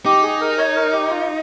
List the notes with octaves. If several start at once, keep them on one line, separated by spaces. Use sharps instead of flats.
D#4 G4
G#4
A#4
C#5
A#4
G4
F4